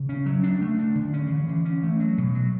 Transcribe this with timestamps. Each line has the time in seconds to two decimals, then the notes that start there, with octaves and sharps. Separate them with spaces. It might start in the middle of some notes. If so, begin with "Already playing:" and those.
Already playing: C#3
0.09 C#4
0.26 F#3
0.43 D4
0.61 A3
0.79 D4
0.95 D3
1.13 C#4
1.30 E3
1.49 E3
1.65 C#4
1.83 A3
2.00 F#3
2.18 B2
2.35 F#3